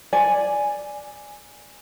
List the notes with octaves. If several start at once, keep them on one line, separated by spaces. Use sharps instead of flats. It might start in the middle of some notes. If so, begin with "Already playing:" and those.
D5 G#5